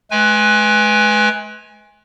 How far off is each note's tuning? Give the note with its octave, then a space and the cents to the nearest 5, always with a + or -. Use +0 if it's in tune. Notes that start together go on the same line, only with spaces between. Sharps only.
G#3 +40 B4 +0 G#5 -15